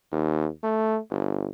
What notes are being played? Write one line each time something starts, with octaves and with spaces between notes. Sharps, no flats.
D#2
A3
G1